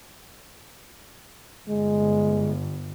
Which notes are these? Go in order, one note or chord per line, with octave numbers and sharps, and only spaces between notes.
G1 G#3